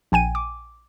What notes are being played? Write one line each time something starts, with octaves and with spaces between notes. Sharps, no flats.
A#1 G5 G#5 D#7
D6